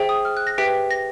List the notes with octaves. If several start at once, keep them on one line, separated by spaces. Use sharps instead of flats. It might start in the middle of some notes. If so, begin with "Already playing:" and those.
Already playing: G#4 C5 E5 G5
D#6
F6
F#6
A#6
G4 B4 E5 G5 B6
A#6